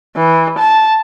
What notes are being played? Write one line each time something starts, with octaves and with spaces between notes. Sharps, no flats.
E3
A5